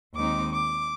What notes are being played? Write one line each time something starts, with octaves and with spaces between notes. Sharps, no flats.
D#2 D#3 G#3 C4 D#4 D6
D6